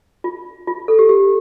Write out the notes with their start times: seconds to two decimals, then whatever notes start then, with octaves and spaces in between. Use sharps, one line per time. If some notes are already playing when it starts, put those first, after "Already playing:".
0.24 F4
0.67 F4
0.88 A4
0.99 G4
1.09 G4